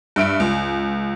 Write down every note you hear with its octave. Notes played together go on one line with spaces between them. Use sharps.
G2 E5 D7
C#2